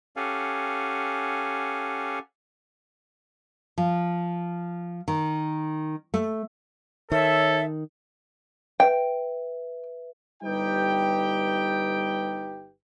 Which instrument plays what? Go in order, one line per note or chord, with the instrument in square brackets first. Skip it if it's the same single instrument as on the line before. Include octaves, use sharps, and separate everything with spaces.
[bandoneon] C#4 G4 A4 F5 F#5 G#5
[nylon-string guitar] F3
D#3
A3
[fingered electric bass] D#3 [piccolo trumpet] A4 [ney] C#5 [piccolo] E5
[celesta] B4 E5 [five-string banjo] G5
[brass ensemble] G1 G3 D#4 G4 B4 G5